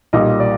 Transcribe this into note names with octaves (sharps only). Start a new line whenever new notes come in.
B1 A#2 G3 D#5
D5